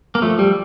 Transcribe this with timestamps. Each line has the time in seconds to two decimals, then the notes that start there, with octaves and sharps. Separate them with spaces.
0.15 A#3
0.22 F3 A3
0.38 G3 G4